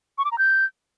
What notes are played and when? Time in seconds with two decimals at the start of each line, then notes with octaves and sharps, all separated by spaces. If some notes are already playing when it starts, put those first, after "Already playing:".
0.18 C#6
0.25 D6
0.32 A#5
0.38 G6